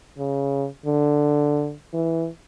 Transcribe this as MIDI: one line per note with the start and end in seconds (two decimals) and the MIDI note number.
0.18 0.66 49
0.86 1.73 50
1.94 2.28 52